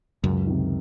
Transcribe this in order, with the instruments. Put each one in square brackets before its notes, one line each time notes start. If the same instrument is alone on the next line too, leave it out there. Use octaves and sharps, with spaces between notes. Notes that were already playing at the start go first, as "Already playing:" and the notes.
[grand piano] C#2 [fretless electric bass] F#2
[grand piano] C3 D#3